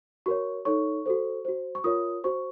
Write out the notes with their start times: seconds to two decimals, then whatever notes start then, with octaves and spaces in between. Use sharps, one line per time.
0.26 F#4 A#4 C#5 C#6
0.65 D#4 A4 C#5 C#6
1.06 F#4 A4 C5
1.45 F#4 C5
1.75 C#6
1.84 F4 A#4 C#5 D#6
2.24 F#4 C5 C#6